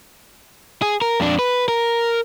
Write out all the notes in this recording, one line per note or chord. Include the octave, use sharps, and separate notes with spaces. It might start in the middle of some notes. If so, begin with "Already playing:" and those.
G#4
A#4
F2 D4
B4
A#4